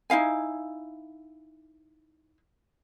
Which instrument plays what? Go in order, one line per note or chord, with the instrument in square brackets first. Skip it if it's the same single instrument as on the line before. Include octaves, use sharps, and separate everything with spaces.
[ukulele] D#4 E4 F5 G#5